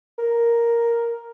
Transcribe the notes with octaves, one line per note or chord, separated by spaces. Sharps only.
A#4